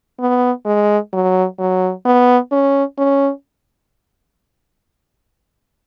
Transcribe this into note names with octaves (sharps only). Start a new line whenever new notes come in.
B3
G#3
F#3
F#3
B3
C#4
C#4